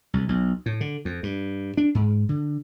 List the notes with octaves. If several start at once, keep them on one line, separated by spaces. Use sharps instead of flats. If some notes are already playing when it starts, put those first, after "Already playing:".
C2
B1
A2
D3
F2
G2
D4
G#2
D3